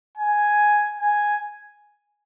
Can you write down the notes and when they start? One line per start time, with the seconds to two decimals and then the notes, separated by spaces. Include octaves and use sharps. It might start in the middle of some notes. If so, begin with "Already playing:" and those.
0.17 G#5
1.00 G#5